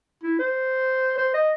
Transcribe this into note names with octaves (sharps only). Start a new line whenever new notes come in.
E4
C5
C5
D#5